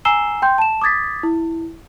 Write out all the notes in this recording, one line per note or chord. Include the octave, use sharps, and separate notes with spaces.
G#5 A#5 E6 C7 E7 G7
G5 C6 G6
A5 E7
D6 D#6 G#6 A6 B6
E4